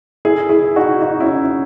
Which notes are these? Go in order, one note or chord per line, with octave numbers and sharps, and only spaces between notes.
E4 G#4
E4 G#4
D#4 F#4
D#4 F#4
C#4 E4